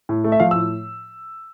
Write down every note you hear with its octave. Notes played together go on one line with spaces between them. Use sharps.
A2
A3
E5
F3 F5
E6
A2